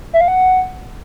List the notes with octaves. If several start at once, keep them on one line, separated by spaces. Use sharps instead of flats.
E5
F5
F#5